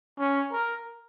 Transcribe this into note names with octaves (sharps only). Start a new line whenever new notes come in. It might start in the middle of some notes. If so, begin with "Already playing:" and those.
C#4
A#4